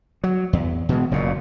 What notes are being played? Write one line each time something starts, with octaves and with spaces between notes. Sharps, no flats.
F#3
E2
B2 E3 G#3
F#1 F#2 A#2